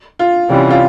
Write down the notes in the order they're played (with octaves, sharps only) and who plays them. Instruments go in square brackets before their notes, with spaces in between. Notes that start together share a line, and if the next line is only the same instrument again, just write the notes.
[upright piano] F4
[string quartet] C3 E3 G3 C#4
[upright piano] F4